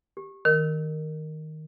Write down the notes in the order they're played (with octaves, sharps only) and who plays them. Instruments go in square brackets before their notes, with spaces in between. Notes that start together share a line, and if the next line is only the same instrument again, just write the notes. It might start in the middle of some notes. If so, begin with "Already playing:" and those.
[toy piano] G4
[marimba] D#3 [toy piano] A#4